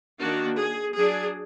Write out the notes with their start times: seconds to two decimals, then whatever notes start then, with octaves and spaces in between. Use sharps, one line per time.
0.19 D#3 A#3 D4 F#4
0.59 G#4
0.97 F#3 D4 G#4